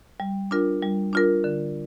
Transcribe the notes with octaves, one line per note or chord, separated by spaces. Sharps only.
G3
D4 F4 A#4
G3
D4 F4 A#4
D3